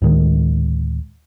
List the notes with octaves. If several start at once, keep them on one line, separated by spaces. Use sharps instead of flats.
D2 A2 D#3 G#3